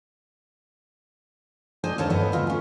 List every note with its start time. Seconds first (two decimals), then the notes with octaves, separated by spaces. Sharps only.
1.84 D4 C5 D#5 G#5
1.98 D#2 D#4 A4 A#4 C#5 A5
2.10 G2 B3 D#5
2.32 D2 B3 F4 D#5
2.47 C#4 G#4